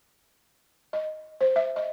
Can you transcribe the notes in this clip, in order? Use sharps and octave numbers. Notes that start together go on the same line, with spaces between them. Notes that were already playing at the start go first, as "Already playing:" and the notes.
D#5
C5
E5
D#5